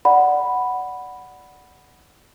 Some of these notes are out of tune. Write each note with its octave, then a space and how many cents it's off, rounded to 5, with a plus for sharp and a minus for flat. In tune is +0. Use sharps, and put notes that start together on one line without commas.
D5 +0 F#5 +0 B5 +0